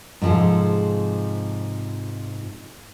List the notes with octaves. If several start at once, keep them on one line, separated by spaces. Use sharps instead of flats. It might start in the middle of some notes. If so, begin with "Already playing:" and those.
G#2 C3 F3 G#4 A4